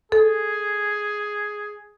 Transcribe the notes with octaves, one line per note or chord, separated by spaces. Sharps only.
G#4 A4